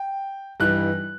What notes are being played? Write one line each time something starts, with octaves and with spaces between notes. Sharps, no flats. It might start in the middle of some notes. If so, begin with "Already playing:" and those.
Already playing: G5
G2 E3 G3 D#4 F#6